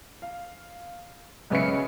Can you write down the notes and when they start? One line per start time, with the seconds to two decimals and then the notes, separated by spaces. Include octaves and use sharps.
0.22 F5
1.50 B1 C#3 C#4 B4 E5 C#7